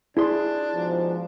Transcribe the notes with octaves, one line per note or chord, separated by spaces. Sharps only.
D4 E4 G#4 C6
G#2 B2 F3